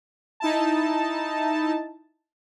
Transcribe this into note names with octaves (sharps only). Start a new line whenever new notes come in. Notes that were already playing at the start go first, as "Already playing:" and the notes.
D#4 E4 A5